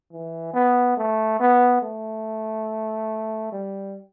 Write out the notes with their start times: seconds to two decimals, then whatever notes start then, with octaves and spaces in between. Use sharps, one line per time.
0.12 E3
0.54 B3
0.97 A3
1.40 B3
1.82 A3
3.52 G3